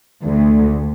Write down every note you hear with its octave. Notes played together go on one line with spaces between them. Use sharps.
D2